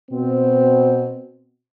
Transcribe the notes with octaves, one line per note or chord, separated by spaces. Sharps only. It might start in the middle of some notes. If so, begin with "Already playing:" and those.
B2 C4